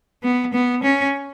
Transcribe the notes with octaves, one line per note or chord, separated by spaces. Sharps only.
B3
B3
C#4